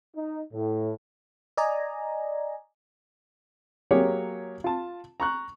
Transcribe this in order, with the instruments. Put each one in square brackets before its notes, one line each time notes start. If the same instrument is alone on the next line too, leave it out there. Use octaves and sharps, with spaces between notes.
[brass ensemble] D#4
A2
[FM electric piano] D5 D#5 G#5 A#5
[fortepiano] F#3 A#3 G4 G#4 C#5
F4 A5
A#5 C#6 F#6